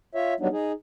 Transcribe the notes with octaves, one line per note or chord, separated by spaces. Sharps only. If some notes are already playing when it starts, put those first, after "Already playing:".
F4 C#5 E5
F#3 G3 B3 D4 D#4
D#4 G#4